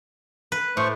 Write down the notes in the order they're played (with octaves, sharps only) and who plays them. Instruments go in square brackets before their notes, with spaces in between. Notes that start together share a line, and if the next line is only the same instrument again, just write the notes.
[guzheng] B4
[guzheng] A2 [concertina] A3 C5 C#6